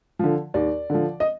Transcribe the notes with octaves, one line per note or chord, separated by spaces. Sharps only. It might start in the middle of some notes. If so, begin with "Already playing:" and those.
D3 F3
D#2 D5
D3 F3
D#5